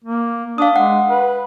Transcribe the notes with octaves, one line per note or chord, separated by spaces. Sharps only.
A#3
D4 F5 D#6
G#3 F#5
B4